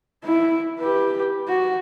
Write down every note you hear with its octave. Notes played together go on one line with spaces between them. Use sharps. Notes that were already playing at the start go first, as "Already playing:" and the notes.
E4
G4 B4
F#4